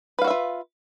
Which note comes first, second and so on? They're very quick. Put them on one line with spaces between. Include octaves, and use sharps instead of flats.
B4 F5 F#4 E5 F4